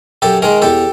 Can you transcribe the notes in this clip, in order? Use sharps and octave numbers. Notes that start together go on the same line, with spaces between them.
F#2 G4 A4
D#3 G#3 G#4 A#4
E2 G4 A4